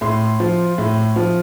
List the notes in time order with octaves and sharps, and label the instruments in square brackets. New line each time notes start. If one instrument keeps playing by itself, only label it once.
[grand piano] A2 C6
F3
A2
F3